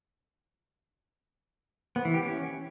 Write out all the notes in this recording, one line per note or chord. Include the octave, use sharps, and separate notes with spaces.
B3
E3
G4
C#4